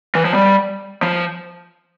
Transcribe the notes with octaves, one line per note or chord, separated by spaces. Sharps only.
E3
F3
G3
F3